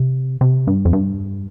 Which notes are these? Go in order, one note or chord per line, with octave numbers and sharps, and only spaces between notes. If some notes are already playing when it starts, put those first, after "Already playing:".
Already playing: C3
C3
G2
F2
G2